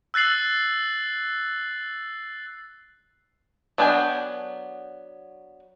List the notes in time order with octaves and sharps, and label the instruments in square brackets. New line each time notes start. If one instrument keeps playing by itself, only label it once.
[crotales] E6 F#6 A6 C7 F#7
[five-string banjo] F#3 B3 D4 G5 G#5